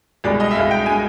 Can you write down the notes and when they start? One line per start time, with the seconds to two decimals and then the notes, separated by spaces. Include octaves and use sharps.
0.24 C2 B2 G#3 D5
0.40 D#5
0.51 E5
0.55 C2 B2 G#3 F5
0.71 G5
0.86 B2 G#3 G#5